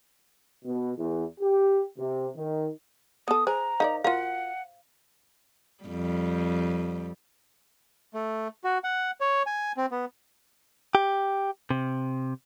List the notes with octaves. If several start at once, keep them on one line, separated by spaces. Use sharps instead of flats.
B2
E2
G4
C3
D#3
B3 A4 D#6
G#4 C5 A#5
D#4 A#4 D5 F5
F4 F#4 A#4 F5 F#5
F2 G3
A3
F#4
F#5
C#5
G#5
C4
B3
G4
C3